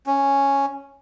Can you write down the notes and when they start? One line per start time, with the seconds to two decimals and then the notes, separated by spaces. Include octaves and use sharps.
0.07 C#4